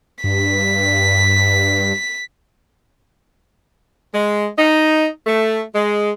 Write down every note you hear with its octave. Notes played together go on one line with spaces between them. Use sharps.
G2 B6
G#3
D#4
A3
G#3